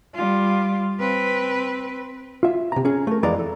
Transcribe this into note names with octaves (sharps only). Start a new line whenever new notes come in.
G3 F4
C4 B4
F4 E5
C3 A#5
C#4 G#4
A3 A#4
F2 E3 G#3 D5 A#5
A4